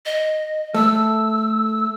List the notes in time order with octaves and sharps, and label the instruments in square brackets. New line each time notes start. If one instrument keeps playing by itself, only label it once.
[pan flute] D#5
[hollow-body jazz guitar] A3 [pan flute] E6